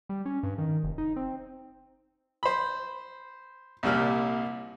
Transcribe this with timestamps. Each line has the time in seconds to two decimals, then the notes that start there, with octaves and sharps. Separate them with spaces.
0.09 G3
0.26 C#4
0.43 G2
0.58 D#3
0.83 F1
0.98 D#4
1.16 C4
2.43 C5 B5
3.83 C2 A#2 G3 F6